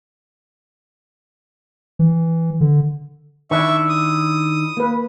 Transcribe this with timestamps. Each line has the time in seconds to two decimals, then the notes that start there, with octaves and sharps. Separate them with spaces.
1.99 E3
2.61 D3
3.51 D#3 D4 E4 E5 C#6
3.89 D#6
4.77 A#3 B4